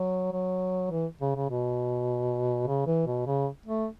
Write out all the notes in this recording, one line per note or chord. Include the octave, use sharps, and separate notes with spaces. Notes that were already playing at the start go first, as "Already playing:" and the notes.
Already playing: F#3
F#3
E3
C#3
C#3
B2
C#3
E3
B2
C#3
A3